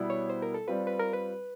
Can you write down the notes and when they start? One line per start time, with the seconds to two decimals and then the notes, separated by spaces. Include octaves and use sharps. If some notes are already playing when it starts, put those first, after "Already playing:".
Already playing: B2 G3 B3 E4
0.10 C#5
0.29 C5
0.42 A#4
0.54 A4
0.67 G3 C4 F4 B4
0.87 B4
1.00 A#4
1.13 B4